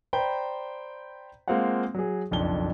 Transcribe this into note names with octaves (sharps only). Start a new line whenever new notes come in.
C5 D5 G5 A#5 B5
G#3 A#3 C4 F4 F5 F#5
F#3 G#4
F#1 B1 F2 D4 G7